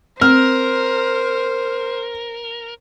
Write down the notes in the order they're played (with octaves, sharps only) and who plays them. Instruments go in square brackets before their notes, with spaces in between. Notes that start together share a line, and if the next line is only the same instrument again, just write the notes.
[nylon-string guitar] C4 [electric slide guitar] A#4 [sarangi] C5 [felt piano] F6